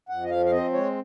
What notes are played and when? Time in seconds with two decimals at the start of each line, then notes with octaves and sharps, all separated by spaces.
0.09 F2 F#5
0.24 D#5
0.30 F3 F5
0.46 F5
0.52 C4 D#5
0.73 G#3 C#5